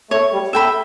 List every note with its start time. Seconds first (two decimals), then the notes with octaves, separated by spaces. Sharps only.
0.11 A3 C#5
0.32 G3
0.53 A3 E5 G5 B5